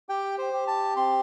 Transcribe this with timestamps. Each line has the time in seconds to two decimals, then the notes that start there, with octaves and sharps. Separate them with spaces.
0.09 G4 G5
0.38 C5
0.53 G4
0.67 A5
0.96 C4 C6